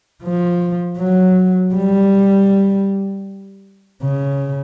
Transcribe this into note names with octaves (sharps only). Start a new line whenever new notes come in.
F3
F#3
G3
C#3